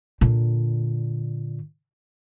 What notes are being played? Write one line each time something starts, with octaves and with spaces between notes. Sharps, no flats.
A#2 D3